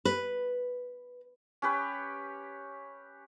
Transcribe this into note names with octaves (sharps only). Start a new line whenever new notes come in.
B4
C#4 G4 B4 C#5